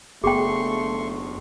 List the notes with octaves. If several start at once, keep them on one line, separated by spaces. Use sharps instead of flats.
F#1 A3 B3 G#4 G5 C6 C#6